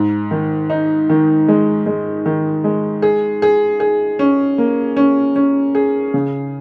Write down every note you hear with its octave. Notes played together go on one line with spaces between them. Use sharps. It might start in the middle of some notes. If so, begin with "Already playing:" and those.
Already playing: G#2
D#3
D#4
D#3
G#3
G#3
D#3
G#3
G#4
G#4
G#4
C#4
A#3
C#4
C#4
G#4
C#3